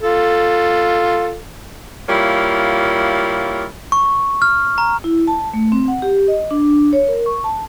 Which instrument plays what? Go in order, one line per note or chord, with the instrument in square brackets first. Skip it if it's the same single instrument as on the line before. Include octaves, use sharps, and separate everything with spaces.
[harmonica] F4 A4
[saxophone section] G3 A#3 E4 F4 C#5
[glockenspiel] C#6
F6
A#5
[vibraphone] E4
A5
A3
C4
F#5
G4
D#5
D4
C#5
A#4
C#6
A5